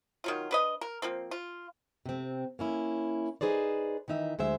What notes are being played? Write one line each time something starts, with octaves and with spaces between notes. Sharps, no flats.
D#3 F#3 F4
D4 B4 D#5
A#4
F3 A#3 C4
F4
C3 C4
A#3 C#4 E4
D#4 G#4 B4 C5 D5
D#3 E3 D#4 E5
D2 G#3 C5 E5